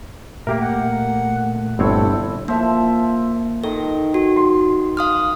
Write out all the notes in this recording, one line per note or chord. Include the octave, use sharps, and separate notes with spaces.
A#2 A3 A#3 G4 A#4
F#5
G1 C4 E4 A4 C#5
F3 A#3 E5
D#3 A4
F#4
C6
F5 D#6 F6